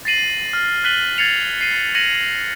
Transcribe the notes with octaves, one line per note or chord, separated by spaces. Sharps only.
A6 A#6 C7 D#7 F#7
F6
F#6 A6 B6 D#7 F#7 G7
G#6 A6 C7 C#7 F7
C7 D#7
G#6 A#6 C#7 D#7 F#7